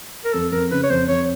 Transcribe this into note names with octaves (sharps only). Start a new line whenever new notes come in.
A#4
F2 A4
F2 A#4
C#3 B4
C#5
F2 C5
F2 C#5